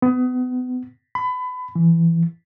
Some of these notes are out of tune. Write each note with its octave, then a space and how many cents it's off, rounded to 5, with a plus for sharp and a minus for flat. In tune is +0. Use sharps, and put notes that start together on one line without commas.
B3 +30
B5 +25
E3 +15